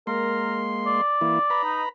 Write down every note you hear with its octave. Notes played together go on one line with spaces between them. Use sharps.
G#3 A#3 A#4 C6
D5
E3 A#3 E4
B4 A#5 B5
D#4